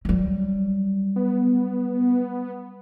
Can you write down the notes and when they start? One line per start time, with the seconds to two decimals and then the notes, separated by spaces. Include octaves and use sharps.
0.05 F#3 G3
1.16 B3